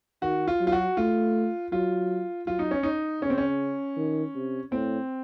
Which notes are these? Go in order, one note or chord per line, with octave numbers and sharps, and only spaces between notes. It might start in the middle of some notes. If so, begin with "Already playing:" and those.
D#3 F#4
F4
F#3
F4
F#4
A3 F4
F#3 F4
F#3 F4
D#4
C#4
D#4
C#3 C#4
C4
C#4
D#3
C3
A2 C4